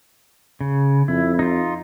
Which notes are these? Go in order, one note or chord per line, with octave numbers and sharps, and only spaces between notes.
C#3
F2 E4
D#4 F4